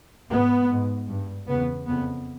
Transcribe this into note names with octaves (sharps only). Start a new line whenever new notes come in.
G#2 B3
G#2
G2
E2 C#3 B3
F2 C#3 B3